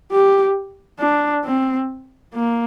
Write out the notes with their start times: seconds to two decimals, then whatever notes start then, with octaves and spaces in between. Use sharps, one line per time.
0.11 G4
1.00 D4
1.45 C4
2.34 A#3